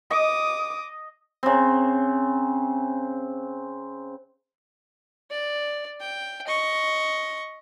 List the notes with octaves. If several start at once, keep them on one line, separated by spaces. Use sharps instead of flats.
D#5 D6 D#6
C#3 C4
D5
G5
D#5 C#6